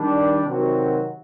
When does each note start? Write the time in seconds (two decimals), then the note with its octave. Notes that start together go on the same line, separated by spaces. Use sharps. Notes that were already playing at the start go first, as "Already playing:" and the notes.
Already playing: D#3 G3 D4
0.43 C3 D#3 F#3 C4 F#4